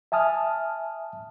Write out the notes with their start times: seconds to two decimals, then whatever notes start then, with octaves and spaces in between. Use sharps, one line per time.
0.12 E5 G#5 A5 D#6 F6